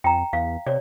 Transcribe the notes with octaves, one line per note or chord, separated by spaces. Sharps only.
F2 G5 A#5
E2 F5
C3 C#5 D5